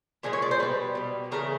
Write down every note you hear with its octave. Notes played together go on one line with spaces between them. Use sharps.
A#2 F3 G#3 G#4
C#5
D5
C5
B2 G3 B4
B2 G3
C#3 E3 A3 A#4